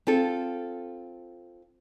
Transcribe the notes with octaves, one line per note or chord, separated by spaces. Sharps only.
C4 F4 A4